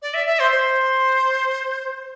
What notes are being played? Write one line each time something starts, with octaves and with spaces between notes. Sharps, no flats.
D5
E5
E5
C5
C5